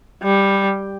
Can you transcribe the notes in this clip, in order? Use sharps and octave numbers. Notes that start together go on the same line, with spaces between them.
G3